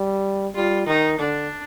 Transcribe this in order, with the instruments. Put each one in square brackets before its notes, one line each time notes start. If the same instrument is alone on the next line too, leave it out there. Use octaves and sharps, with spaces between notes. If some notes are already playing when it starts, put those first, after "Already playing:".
Already playing: [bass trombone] G3
[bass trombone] G3 [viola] F4
[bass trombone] D#3 [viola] D#4
[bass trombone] D3 [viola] D4